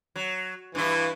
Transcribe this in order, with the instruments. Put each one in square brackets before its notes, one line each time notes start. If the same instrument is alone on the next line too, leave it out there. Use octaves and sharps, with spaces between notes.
[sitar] F#3
[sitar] G2 E4 [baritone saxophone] E3